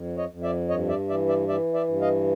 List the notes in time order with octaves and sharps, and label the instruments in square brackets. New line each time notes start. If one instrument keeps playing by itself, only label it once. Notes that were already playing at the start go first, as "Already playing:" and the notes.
Already playing: [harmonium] F2
C#5 D#5
F2
D5 E5
G2 C#5 D#5
D5 E5
E3 D5 E5
D5 E5
E3 D5 E5
D5 E5
G2
D#5 F5